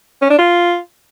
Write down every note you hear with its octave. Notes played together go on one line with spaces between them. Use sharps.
C#4
D4
F4